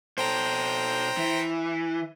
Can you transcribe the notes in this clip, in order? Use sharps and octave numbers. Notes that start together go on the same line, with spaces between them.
B2 A4 C5 G5 A#5
E3